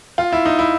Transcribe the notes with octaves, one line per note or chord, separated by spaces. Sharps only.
F4
E4
D#4
E4